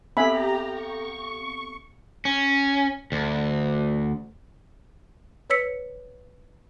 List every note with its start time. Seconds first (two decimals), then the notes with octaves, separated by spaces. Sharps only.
0.17 B3 C4 G4 A4 E5 G#5 A#5 B5
0.70 C#6
2.25 C#4
3.12 D2
5.50 B4 C#5 E6 B6 C#7